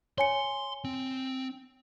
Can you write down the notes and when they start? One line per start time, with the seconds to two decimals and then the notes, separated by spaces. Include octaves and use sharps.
0.18 C#5 G#5 C6 C#7
0.84 C4